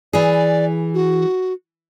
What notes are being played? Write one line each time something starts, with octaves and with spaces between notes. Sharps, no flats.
E3 G#4 D5
F#4